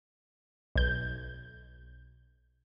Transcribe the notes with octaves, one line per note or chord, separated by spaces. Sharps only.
B1 G6